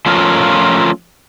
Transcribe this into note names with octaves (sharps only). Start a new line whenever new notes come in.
F3 A3 C#4 F4 A#4